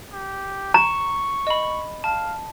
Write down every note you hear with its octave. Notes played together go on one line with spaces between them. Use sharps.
G4
A#5 C#6
D#5 B5
F5 A5